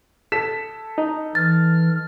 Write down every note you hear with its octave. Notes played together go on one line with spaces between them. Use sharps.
A4 B6 E7
D#4
E3 F6 A6